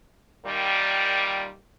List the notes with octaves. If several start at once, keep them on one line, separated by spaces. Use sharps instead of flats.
A#2 D#3 G3